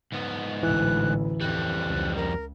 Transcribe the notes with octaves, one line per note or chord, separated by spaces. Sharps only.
G#2 B3
A1 D2 E3 F#6
F2 G3 F#6
C#2
A#4